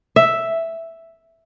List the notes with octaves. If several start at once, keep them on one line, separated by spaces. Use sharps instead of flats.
E5